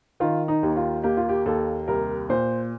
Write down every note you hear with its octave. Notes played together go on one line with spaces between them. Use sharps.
D#3 F4
D#4
D#2
F4
A#3 G4
F4
G4
D#2 A4
C2 A#4
A#2 C5